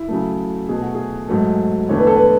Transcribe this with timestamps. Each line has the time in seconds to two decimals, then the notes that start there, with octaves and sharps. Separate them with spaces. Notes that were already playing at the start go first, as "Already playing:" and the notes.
Already playing: E4
0.08 C#3 F#3 A3
0.69 B2 A3 G#4
0.82 F#4
0.95 G#4
1.29 G#2 F#3 A3
1.89 E2 D3 A3 C#5
1.98 B4
2.07 A4
2.16 B4